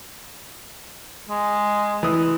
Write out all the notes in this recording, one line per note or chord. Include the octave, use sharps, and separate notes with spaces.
G#3
E3 D#6